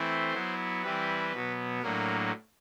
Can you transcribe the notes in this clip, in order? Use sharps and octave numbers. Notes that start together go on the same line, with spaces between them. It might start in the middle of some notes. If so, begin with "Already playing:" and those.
Already playing: E3 A3 C4 E4 C5
F#3 B3 E4
E3 G3 C4 E4 B4
B2 F#3 B3
A2 F#3 A#3 D4 A#4